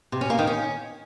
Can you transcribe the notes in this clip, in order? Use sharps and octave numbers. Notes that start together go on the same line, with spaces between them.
C3
C#4
A#3
D#3
C#4